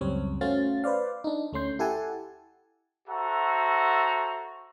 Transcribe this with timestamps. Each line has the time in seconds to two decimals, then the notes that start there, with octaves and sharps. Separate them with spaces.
0.01 C#2 F#2 G3 C4 C#5
0.41 A3 C#4 F#4 C5 F5 A6
0.84 B4 C5 D5 F5
1.24 D4 D#4
1.53 D2 A3 C#4 C6 G6
1.79 E4 G4 A4 F#5 G#5 A5
3.08 F#4 A4 C5 E5 F#5 A#5